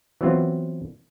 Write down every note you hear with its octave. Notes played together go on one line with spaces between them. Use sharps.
E3 F#3 B3 C4 F4